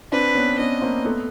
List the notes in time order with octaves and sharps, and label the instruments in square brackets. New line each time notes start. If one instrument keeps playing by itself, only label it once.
[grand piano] C4 D4 [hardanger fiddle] B4
[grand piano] B3 C#4
[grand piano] B3 C#4 [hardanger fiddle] D#5
[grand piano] A#3 C4
A3 B3